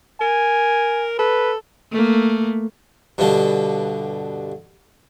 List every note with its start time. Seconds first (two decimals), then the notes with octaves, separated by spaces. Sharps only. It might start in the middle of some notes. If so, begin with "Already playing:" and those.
0.21 A#4 G#5
1.19 A4 B4
1.92 A3 A#3
3.18 G2 B2 D3